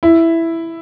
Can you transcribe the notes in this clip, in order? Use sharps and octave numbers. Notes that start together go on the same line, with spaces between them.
E4